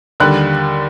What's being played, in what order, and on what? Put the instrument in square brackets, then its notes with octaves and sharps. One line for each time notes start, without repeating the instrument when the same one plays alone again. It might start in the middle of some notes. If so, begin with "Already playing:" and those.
[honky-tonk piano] D#2 D3 G3 F#6